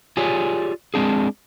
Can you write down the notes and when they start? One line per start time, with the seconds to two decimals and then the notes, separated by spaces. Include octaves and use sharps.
0.17 F4 G4 G#4 C#5 D5
0.94 G#3 C4 D4 G#4